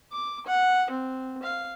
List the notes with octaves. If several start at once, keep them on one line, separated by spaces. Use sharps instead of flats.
D6
F#5
C4
F5